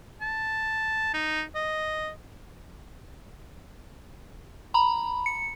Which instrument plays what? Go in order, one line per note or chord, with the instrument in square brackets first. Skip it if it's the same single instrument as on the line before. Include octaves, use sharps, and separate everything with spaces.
[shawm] A5
D#4
D#5
[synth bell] A#5 B5
C#7